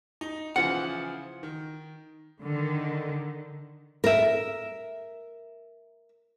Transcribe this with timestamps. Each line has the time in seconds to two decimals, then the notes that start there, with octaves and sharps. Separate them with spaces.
0.21 D#4
0.56 C#3 E3 F3 F#5
1.43 D#3
2.41 D3 D#3
4.04 A#4 E5